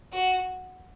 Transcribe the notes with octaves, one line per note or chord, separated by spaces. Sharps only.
F#4